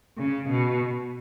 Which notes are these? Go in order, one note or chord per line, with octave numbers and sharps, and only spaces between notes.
C#3
B2